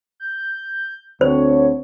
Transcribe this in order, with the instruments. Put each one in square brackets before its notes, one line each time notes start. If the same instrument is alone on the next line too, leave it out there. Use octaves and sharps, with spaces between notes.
[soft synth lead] G6
[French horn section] D2 D3 C4 [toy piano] C5 [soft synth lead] C#5